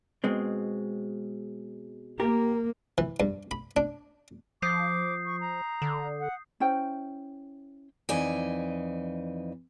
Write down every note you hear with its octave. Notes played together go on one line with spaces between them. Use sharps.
B2 G#3 C4
A#3 G4 A#4
E3
G2
B5
D4
F3 D6 D#6 G6 C7
C#6
A#5
D3
F#5
C#4 E4 C5 G5
F2 E3 D#4 D5 G#5